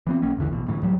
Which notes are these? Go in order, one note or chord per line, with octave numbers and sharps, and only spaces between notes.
E3 B3 C4
B1 A#3 C#4
A1 E2 D3 E3
A1 B2
D2 A2 E3
D1 A2 F#3 G3